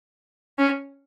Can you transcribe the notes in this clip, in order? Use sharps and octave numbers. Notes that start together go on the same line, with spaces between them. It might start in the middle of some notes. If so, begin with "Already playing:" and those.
C#4